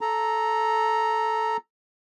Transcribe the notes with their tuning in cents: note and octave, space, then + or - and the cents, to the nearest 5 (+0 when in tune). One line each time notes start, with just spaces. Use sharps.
A4 -10 A#5 +0